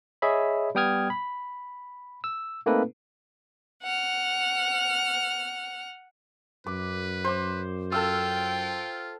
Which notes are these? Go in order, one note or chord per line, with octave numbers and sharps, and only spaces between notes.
G#4 C#5 D#5 E5 B5
G3 B3 G5 D#6 F6 G#6
B5
E6
A3 A#3 C4 D#4 A4 B4
F#5 F6
F#2 B4 D6
C5 D6
F4 A4 F5 G5 E6